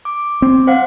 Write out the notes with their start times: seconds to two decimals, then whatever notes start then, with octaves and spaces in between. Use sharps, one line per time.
0.05 D6
0.42 C4
0.67 C5 F5 F#5